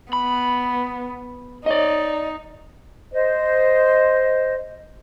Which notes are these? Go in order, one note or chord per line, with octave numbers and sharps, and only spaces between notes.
B3 B5
D#4 D5 D#5
C5 D#5